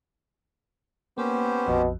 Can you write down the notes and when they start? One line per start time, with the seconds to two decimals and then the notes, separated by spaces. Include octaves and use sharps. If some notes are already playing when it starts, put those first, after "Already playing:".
1.18 A#3 B3 C#4 G4 C5
1.67 A#1 F2 B2